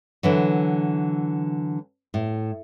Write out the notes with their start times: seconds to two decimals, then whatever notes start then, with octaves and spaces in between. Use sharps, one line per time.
0.23 D3 E3 F#3
2.14 A2